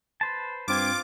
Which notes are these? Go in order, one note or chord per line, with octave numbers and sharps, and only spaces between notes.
B4 C5 A5
G2 C4 F4 D6 G#6